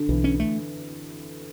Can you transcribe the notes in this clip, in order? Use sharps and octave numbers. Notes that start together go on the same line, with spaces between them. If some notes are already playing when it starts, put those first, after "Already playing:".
Already playing: D3
B1 E3
C#4
A3